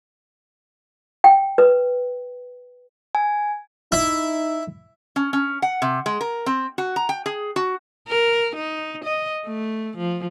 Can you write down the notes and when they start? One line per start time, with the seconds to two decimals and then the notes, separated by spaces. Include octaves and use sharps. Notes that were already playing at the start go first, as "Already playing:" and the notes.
1.24 G5
1.58 B4
3.15 G#5
3.92 D#4 E4
5.16 C#4
5.33 C#4
5.62 F#5
5.82 C3
6.06 G#3
6.21 A#4
6.46 C4
6.78 F#4
6.96 A#5
7.09 G5
7.26 G#4
7.56 F#4
8.08 A#4
8.56 D#4
9.04 D#5
9.46 A3
9.97 F3